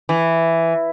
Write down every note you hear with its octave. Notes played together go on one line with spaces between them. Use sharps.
E3